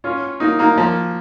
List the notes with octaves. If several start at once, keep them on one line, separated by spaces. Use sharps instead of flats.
C#4 F4
A#3 D#4
A#3 D#4
F3 A#3